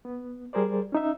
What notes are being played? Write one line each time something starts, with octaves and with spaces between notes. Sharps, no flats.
B3
G3 G#4 A#4 C5 D5
C#4 D#4 E5